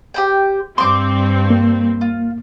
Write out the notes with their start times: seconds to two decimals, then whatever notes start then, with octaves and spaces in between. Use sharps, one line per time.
0.14 G4 C5 G5
0.78 G2 C4 C6 D6
1.50 A#3
2.01 F4